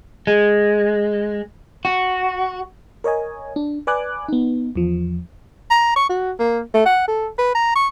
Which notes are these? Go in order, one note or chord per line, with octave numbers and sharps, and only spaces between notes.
G#3
F#4
A#4 C#5 D#5 G#5
D4
B4 D5 G#5 D6 F#6
B3 D#4
E2 F3
A#5
C#6
F#4
A#3
A3
F#5
A4
B4
A#5
C#6